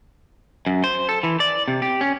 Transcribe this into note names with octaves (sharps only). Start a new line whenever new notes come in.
F#2
C5
A4
E3
D5
C3
G4
C#4